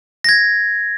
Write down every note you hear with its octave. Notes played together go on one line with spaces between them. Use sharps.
G#6 A#6